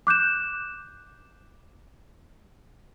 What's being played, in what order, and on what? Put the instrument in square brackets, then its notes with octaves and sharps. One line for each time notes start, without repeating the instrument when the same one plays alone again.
[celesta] D6 F#6 G6 E7